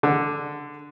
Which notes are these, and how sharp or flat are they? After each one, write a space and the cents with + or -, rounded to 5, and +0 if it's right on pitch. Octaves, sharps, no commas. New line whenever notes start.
D3 +0